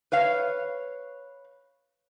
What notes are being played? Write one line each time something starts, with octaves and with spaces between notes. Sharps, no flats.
B4 C#5 F5